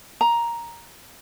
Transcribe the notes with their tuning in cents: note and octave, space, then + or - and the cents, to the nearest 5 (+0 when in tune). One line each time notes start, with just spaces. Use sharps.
A#5 +5